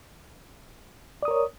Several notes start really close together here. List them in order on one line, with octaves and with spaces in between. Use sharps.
D5 D#6 A#4 C#5